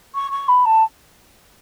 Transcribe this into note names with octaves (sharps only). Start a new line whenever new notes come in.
C#6
C#6
B5
A5